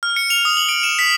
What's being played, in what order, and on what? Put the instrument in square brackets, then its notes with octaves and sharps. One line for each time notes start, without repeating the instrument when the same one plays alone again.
[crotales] F6
C#7
F7
D#6
F#7
D7
E7
B6